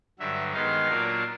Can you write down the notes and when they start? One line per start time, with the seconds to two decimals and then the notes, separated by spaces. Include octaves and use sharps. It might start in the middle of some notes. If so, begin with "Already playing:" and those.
0.19 G2 D3 F#3 E5
0.53 D#3 G#3 B3 D#4 F5
0.89 A#2 F#3 A#3 D4 F4